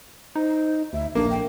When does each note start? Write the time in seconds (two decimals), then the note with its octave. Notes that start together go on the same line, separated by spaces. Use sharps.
0.36 D#4 C5
0.93 D2 E5
1.15 A#1 A#3 D4
1.30 G5